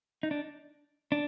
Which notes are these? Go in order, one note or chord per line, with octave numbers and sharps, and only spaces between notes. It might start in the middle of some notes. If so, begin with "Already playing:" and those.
D#4
D4
D4